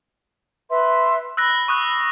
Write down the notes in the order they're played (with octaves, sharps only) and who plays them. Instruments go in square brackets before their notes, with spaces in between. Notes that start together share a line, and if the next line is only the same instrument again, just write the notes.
[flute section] B4 E5 C6
[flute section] B5 [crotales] E6 F#6 A#6
[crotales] C#6 D#6 F#6